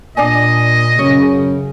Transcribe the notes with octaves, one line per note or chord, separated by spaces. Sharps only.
A#2 D4 D5 D#5 G#5
F#2 C#3 C#5